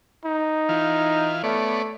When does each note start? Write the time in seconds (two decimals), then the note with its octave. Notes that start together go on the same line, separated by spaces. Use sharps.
0.25 D#4
0.69 E3 F4
1.44 A3 B3 C#5 D5